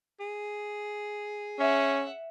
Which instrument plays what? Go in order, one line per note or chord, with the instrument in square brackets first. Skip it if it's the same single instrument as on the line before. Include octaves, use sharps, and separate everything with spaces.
[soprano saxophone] G#4
[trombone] C#4 [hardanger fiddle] E5 F#5